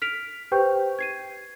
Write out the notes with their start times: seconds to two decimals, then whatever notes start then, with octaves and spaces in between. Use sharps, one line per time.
0.02 F6 B6 D7 F7
0.52 G4 B4 C5 G5 C#6 G6
0.99 G#6 C7 D#7